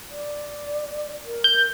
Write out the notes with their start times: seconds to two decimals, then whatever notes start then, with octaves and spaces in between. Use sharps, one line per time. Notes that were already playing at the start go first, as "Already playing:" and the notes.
0.11 D5
1.25 A#4
1.44 G6